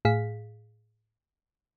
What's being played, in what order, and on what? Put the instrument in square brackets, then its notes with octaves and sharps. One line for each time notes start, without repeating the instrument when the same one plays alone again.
[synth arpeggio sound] A2 G#4 F5 B6